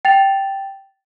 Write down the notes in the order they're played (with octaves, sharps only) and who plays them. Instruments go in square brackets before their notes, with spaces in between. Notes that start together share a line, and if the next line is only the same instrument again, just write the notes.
[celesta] G5 A6 F7